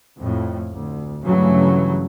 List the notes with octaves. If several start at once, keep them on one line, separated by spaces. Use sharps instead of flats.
F2 A2
D2
G2 C#3 E3 F#3 A3